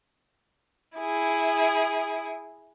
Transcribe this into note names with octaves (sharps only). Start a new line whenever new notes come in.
E4 G#4